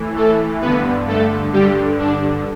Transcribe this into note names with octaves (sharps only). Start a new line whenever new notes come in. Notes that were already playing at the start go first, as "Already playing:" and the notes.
Already playing: A2 E3
A3 A4
G2 D3 B3 B4
A3 A4
G2 D3 G3 G4
D4